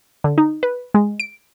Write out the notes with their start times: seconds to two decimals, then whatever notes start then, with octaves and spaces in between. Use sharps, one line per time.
0.24 D3
0.38 D#4
0.63 B4
0.94 G#3
1.20 D7